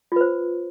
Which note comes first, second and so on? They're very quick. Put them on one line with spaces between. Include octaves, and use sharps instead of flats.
F4 B4 C5